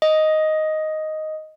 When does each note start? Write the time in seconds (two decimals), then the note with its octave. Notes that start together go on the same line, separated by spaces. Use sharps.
0.02 D#5